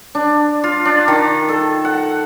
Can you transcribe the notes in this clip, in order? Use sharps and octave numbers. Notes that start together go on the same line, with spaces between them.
D4
F4
D4
D#3
A4
F#5